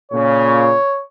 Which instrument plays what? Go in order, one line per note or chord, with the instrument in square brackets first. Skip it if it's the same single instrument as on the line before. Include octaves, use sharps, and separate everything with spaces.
[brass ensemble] A#2 C#3 [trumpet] C#5